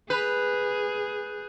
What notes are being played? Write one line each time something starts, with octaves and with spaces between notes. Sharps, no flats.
G#4 B4 F#6 G6 F7